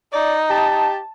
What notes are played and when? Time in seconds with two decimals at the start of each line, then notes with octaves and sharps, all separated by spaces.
0.13 D#4 D5
0.50 G4 A5